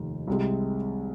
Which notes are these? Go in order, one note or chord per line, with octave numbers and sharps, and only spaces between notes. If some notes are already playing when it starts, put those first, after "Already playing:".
Already playing: F1 D#2 D#3
C2 C3 G#3